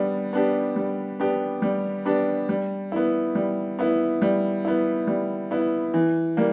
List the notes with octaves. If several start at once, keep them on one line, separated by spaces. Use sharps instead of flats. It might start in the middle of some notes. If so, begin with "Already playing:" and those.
Already playing: G3 B3 D4
B3 D4 G4
G3
B3 D4 G4
G3
B3 D4 G4
G3
B3 E4
G3
B3 E4
G3
B3 E4
G3
B3 E4
E3
G3 A#3